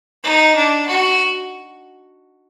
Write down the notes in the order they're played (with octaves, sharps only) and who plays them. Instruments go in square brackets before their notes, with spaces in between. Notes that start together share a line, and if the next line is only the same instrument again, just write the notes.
[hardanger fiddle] D#4
D4
F#4